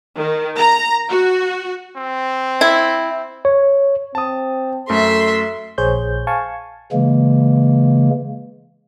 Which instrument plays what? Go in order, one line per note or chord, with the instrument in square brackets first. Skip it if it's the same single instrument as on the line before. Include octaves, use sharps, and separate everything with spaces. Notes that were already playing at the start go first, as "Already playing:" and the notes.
[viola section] D#3
A#5
F#4
[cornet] C4
[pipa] E4
[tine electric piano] C#5
[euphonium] C4 [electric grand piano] A5 D#6
[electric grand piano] F#2 A3 [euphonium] A4 [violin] E5 C6
[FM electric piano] A#1 G#4 C5 C#5 G6
F5 G#5 A5 C#6
[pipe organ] C#3 E3 G#3 A#3